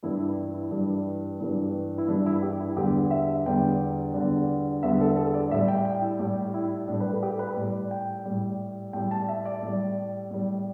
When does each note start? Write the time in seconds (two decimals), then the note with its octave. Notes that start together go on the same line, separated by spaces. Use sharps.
0.03 G2 E3 G3 E4
0.20 E4
0.54 E4
0.71 G2 E3 G3
1.40 G2 E3 G3
1.98 E4
2.08 G2 E3 G3 D4
2.26 E4
2.42 G4
2.60 E4
2.76 E2 D3 G3 G4
3.11 E5
3.46 E2 D3 G3 G5
4.14 E2 D3 G3
4.82 E2 D3 G3 E5
5.00 A4
5.16 A4
5.34 D5
5.50 A2 E5
5.54 G3
5.68 G5
5.85 G5
6.02 E4
6.19 A2 G3 G4
6.54 E4
6.88 A2 G3 D4
7.00 B4
7.11 A4
7.22 G4
7.39 B4
7.56 A2 G3 D5
7.91 G5
8.25 A2 G3
8.93 A2 G3 G5
9.11 A5
9.28 E5
9.45 D5
9.62 A2 G3
10.30 A2 G3